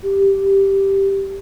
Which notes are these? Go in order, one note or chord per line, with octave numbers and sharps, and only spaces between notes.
G4